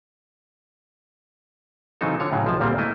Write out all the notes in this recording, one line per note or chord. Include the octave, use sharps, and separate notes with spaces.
C#3 E3 F#3 C4 D#4 A4
D3 F4 C#5
A2 C#3 F#3
B1 F3 A5
D2 A#2 G3 A#3 C4
A3 A#3 E4 D#5